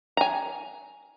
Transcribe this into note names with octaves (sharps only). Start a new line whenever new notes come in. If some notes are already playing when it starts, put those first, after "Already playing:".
G#5 A#5